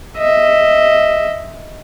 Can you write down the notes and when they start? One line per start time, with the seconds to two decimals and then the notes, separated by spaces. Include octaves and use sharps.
0.18 D#5 E5